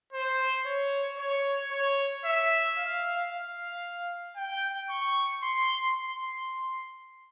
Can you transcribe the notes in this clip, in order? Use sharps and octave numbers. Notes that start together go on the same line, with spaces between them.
C5
C#5
C#5
C#5
E5
F5
F5
G5
C#6
C6
C6